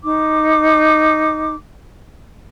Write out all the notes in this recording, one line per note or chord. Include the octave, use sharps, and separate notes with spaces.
D#4 D6